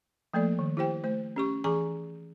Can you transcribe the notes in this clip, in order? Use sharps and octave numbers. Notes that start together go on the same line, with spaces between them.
F3 A3 A#3 A4 D5
D#3
E4 G4 C5 G5
A3 C5
C#4 G4 C#6
E3 G#4 G#5 A#5 C#6